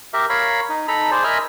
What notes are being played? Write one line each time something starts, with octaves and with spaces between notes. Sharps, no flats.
G4 A#4 E5
A#4 C#5 F5 B5
D#4
D#4 A4 A#5 B5
G#4 C5 D5
A#4 D#5 E5 G#5 A#5 B5